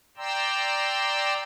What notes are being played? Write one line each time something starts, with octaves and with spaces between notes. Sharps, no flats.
D5 G5 A#5 C6 E6